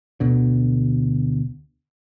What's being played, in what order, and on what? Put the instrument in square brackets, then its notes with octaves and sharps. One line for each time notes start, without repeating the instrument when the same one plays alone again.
[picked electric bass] D2 B2 D3